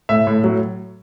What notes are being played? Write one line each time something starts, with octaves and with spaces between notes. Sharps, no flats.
A2 E5
A2
F#3